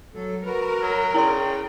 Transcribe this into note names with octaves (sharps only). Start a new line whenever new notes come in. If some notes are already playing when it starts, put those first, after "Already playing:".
F#3 A4
F#4 A#4 B4
F#3
C#3 E4 D5 G5 C6